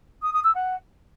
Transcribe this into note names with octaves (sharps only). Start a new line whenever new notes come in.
D#6
D#6
E6
F#5